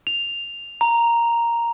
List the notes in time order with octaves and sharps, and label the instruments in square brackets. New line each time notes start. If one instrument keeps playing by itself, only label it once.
[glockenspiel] F7
A#5